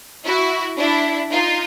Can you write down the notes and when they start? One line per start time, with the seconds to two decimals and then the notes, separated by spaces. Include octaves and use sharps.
0.25 E4 F#4
0.77 D4 E4
1.31 D#4 F4